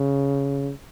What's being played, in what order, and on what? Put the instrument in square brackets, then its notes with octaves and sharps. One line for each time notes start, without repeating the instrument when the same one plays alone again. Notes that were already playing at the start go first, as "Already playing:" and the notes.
Already playing: [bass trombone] C#3